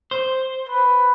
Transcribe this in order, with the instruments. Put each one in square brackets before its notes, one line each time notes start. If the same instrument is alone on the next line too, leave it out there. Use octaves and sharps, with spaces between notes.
[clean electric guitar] C5
[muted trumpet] B4